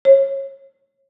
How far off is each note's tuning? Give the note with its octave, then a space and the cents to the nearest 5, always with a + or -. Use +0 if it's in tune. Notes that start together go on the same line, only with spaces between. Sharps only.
C#5 -25